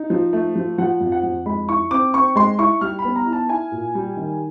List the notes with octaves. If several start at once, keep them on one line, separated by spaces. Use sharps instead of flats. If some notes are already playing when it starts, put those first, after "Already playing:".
Already playing: D#4
F3
A3
F3
F3 F#5
F2
F#5
F2
G#3 B5
E4 C#6
C4 D6
C4 C#6
G#3 C6
E4 C#6
G3 F6
B5
B3
A#5
E4
A5
E4 G#5
A#2
G3
D#3